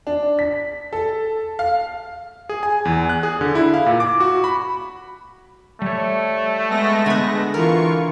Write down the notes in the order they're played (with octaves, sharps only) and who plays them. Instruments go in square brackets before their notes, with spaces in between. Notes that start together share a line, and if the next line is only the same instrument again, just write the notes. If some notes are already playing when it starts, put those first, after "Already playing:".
[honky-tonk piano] D4
B6
A4
F5
[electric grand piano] G#4
G#5
E2
F#6
G#4
D3
E4
F5
A#2
D6
F#4
B5
[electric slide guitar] G3 C#5 [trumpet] A3
[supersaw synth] G#3 B3 A#6
[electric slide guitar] D3 [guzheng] B4 G#5
[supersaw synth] E3 F4 C#6 [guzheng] A#4